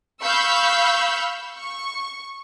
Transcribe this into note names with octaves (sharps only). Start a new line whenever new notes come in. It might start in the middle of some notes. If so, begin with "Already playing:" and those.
F5 B5 C#6 E6 G6
C#6